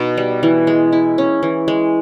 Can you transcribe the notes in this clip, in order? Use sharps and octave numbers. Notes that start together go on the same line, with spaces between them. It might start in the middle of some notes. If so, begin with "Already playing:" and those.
Already playing: B2 B3 D#4
G3
E3
G#3
E4
C#4
E3
G#3